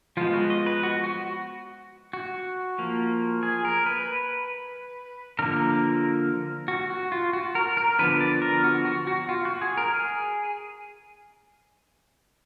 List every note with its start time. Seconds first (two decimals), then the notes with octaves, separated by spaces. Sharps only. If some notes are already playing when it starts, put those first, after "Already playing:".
0.17 F3 G#3 B3 F4
0.34 F#4
0.50 D#5
0.66 B4
0.83 F#4
1.04 F#4
2.13 F#4
2.78 F3 A#3
3.43 G#4
3.65 A#4
3.86 B4
5.39 D3 F3 A#3 A#4
6.68 F#4
6.90 F#4
7.12 F4
7.33 F#4
7.55 A#4
7.77 A#4
7.99 D3 F3 B3 B4
8.20 D5
8.42 A#4
8.64 F#4
8.85 F#4
9.07 F#4
9.29 F4
9.45 F#4
9.61 G#4
9.77 A#4
9.94 G#4